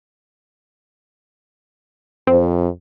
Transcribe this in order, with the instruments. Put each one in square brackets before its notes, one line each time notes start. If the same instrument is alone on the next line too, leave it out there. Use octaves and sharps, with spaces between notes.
[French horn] F2 [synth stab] C4